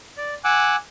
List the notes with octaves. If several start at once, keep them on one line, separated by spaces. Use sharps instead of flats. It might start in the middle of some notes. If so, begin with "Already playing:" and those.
D5
F#5 G#5 D6 E6 F#6